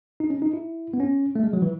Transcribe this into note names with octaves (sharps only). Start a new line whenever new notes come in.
D#4
C#4
D#4
E4
B3
C#4
A3
G#3
F#3
E3